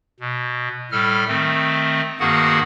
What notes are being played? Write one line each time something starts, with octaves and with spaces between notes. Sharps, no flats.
B2
A2 G3 A4 F6
D#3 A3 C4
G2 D#3 A#3 F#4 G#4 F#5